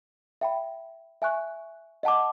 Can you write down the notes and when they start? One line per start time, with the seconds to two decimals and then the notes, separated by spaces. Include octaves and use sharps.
0.41 E5 G5 B5
1.22 E5 G#5 C#6 F#6
2.03 D#5 F#5 A5 D6